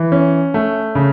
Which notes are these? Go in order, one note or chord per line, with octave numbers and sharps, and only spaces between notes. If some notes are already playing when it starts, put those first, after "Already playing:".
Already playing: E3
C#4
A3
C#3